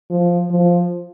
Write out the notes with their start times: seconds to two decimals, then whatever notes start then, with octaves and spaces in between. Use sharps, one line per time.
0.10 F3
0.50 F3